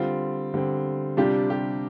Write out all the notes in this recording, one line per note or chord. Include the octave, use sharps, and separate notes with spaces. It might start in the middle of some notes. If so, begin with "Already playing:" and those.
Already playing: D3 G3 C4 F4
D3 G3 C4
C3 G3 D4 F4 G4
G4